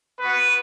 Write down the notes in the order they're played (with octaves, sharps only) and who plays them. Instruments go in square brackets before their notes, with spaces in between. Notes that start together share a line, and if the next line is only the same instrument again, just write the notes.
[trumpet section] B3 F#4 B4